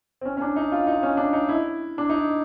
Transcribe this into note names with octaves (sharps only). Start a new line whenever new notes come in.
C4
C#4
C#4
D4
D#4
F4
D#4
C#4
D4
D#4
E4
D4
D#4